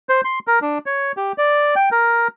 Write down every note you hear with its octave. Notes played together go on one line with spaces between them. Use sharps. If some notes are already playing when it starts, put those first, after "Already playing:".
C5
C6
A#4
D4
C#5
G4
D5
G5
A#4